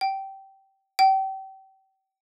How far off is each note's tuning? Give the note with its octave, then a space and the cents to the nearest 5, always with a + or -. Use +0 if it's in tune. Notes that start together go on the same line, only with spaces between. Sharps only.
G5 -15
G5 -30